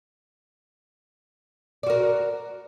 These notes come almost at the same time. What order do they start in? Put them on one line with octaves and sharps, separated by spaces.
D5 F#4 A#4